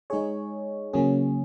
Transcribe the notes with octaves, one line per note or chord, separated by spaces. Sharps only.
G#3 D#4 G#4 C#5
C#3 F#3 A#3 C#4 G#4